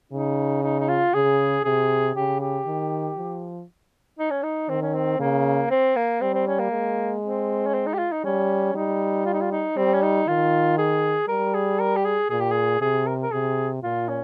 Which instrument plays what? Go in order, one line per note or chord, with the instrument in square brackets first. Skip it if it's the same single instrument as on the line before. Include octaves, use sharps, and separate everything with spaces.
[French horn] C#3 [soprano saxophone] D#4
[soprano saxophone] D#4
D#4
F4
[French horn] C#3 [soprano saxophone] G#4
[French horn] C3 [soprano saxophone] G#4
[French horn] C#3 [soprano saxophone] G4
[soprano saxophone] G4
[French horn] D#3
F3
[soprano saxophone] D#4
C#4
D#4
[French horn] D#3 [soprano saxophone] C4
[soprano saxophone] C#4
C4
[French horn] C#3 [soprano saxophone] A#3
[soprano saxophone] C4
A#3
[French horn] G3 [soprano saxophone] C4
[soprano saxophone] C4
C#4
A#3
[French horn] G#3
[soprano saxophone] C4
C#4
C4
D#4
G4
F4
D#4
[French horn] G3 [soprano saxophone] C#4
[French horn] G3 [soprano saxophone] D#4
[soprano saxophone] F4
D#4
F4
D#4
[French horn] G3 [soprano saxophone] C4
[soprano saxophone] C#4
D#4
[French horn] D#3 [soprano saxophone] F4
[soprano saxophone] G#4
[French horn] G3 [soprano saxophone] A#4
[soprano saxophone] G#4
A#4
G4
G#4
[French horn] A#2 [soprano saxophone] G#4
[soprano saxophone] G4
G#4
[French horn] C3 [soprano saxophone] G#4
[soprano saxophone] A#4
A#4
[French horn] C3 [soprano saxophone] G#4
[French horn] A#2 [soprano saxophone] F4
[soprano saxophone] C#4